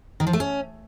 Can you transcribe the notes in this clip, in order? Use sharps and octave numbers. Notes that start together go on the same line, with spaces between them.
D#3
F3
A3
C#4